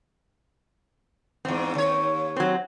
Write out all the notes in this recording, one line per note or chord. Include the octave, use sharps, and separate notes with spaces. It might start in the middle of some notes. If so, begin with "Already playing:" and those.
E2 G#2 C4
D#2 C#5
F#3 C4